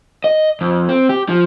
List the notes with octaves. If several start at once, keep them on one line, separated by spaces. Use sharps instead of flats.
D#5
F2
C4
G4
F3